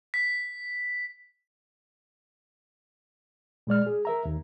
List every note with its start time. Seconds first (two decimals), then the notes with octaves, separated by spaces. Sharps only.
0.14 B6
3.67 A#2 G#3 D5 F6
3.87 G#4
4.05 A#4 E5 A#5
4.25 D#2